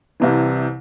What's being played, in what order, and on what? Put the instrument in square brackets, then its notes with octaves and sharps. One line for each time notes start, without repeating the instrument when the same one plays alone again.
[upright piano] C2 C3 E3